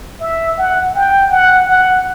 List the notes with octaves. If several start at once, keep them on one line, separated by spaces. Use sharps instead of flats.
E5
F#5
G5
F#5
F#5